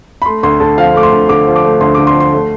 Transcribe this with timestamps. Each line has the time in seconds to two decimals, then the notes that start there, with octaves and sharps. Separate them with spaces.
0.22 B5
0.26 A3 C6
0.43 D2 C6
0.60 D3 A5
0.77 F3 F5
0.94 A3 D6
1.03 C6
1.12 D2
1.29 D3 D6
1.47 F3
1.56 D6
1.64 A3
1.81 D2 C6
1.94 D3 D6
2.07 C6
2.15 F3
2.20 C6
2.32 A3